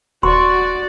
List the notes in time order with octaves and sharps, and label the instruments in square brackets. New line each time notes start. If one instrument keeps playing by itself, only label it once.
[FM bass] D#1 [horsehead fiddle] F#4 D5 [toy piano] C6 [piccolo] C#6